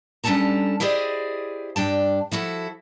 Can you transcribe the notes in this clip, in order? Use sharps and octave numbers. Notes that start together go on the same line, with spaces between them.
G3 C#4 D4 A4 A5 A#5
E4 G4 G#4 C5 D5 D#5
G2 D4 G5 A5
F3 E4 F#4 A4